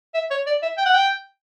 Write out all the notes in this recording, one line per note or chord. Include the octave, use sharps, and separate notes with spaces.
E5
C#5
D5
E5
G5
F#5
G5